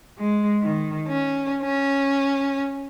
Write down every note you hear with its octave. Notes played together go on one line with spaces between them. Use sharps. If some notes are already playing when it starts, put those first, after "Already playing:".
G#3
D#3
C#4
C#4